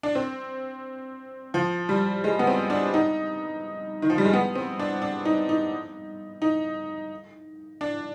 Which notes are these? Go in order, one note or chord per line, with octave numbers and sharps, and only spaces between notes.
D4
C4
F3
G3
G#3
B3
C4
D4
D#4
D#3
F3
G3
G#3
B3
C4
D4
D4
D#4
D#4
D#4
D4